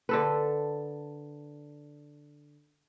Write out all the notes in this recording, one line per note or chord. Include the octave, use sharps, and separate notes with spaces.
D3 A4 B4